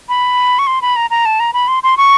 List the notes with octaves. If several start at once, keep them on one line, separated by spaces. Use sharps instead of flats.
B5
C#6
C6
B5
A#5
A#5
A5
A#5
B5
C6
C6
C#6